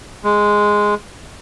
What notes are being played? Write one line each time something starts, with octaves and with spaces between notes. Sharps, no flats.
G#3